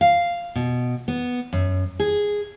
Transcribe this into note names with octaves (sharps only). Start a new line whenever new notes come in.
F5
B2
B3
F#2
G#4